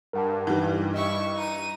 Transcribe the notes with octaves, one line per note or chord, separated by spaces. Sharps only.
G2 A#4 F#5 A5
E3 G3 D#4
E4 D#5 C#6
D#4 D#7